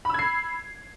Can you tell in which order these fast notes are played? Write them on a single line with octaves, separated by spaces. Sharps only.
B5 E6 G#6 C7